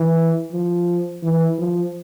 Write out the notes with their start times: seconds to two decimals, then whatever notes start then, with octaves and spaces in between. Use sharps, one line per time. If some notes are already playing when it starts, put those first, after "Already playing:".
Already playing: E3
0.52 F3
1.23 E3
1.58 F3